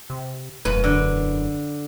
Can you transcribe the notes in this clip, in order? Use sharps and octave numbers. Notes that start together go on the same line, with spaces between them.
C3
E1 F#2 B4
D3